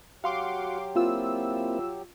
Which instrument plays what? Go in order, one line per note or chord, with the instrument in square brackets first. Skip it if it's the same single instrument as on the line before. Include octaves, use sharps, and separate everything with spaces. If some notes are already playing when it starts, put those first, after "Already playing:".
[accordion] F#3 G4 [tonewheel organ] F#4 F#5 [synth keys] F5 C6 D6
[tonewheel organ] A#3 C4 E4 [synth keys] F4 E6